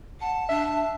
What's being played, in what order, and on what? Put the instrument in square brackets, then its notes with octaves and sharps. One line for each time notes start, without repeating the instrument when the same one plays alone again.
[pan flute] F#5 [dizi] A5
[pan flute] D4 [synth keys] E5